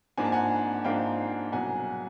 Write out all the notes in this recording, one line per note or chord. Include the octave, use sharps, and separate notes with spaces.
G#2 F3 A#3 D4 G#5
A5
F#5 G#5
G#2 F3 A#3 D4 F5 G5
C2 B2 F#3 F#5 G#5